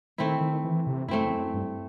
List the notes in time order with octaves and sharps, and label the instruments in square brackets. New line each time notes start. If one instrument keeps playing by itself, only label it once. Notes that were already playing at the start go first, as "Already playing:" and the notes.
[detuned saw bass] D#3 [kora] A3 C4 E4
[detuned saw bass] D#3
E3
C3
[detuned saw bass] F#2 [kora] A3 C4 E4
[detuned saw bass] E2
F#2
G2